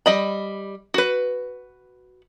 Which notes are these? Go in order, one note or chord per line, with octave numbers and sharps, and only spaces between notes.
G3 D#5 B5
F#4 B4